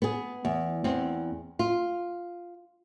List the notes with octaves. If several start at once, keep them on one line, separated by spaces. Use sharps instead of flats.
B3 G#4
E2
E2 C4
F4